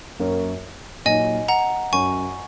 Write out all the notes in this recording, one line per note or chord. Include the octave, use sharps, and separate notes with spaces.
F#2 F#3 A#3 C#4 A#4
A#2 F#3 D#4 D#5 G#5
F#5 A#5
F#2 F#3 C#4 G#5 C#6